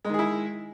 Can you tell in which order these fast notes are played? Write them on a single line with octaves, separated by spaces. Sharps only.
G#3 D#3 G#4 E4